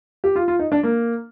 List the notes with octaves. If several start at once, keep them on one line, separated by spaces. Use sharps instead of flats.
G4
F4
F4
D#4
D4
A#3